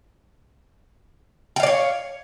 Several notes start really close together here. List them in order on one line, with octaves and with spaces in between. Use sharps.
G5 F5 D5 C#5